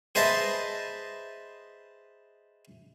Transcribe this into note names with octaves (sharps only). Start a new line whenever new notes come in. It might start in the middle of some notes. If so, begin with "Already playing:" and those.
G#4 B4 C5 D#5 E5 A5